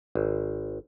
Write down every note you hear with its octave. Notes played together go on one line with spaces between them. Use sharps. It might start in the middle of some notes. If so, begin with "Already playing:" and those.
G#1